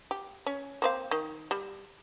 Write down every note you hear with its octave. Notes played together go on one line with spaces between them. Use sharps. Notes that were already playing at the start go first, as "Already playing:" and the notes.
G4
C#4
A#3 C4 F5
D#3
G3